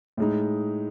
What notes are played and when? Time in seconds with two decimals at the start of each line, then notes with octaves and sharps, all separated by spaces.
0.17 A2 G#3 D#4